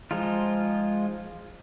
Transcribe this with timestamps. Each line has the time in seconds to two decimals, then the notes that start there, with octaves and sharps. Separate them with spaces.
0.11 F3 G#3 D#4 F4